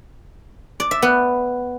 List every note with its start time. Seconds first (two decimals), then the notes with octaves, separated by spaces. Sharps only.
0.80 D5
0.91 E5
1.02 B3